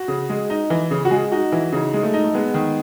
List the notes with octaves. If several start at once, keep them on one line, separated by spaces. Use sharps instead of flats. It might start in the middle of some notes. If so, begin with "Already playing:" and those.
Already playing: F#4
C#3
G#3
D#4
E3
C#3
F#4
G#3 G#4
D#4 F#4
E3 E4
C#3 D#4
G#3
A3
D#4
A3
G#3 B3
D#3